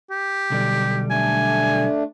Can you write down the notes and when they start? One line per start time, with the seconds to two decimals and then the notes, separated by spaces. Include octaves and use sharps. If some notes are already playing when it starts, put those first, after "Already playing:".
0.11 G4
0.50 B1 D3 G3
1.10 A3 D4 G#5